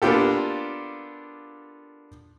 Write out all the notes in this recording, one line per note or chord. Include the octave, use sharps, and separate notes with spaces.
A#3 B3 D4 F4 G4 A4